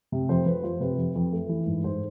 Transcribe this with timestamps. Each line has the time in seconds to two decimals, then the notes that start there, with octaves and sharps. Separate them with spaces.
0.12 C3
0.29 F2 C5
0.46 F2 B4
0.63 F3 C5
0.80 C3 B4
0.98 F2
1.15 F2
1.32 A3
1.49 E3
1.66 G#2
1.84 G#2 C5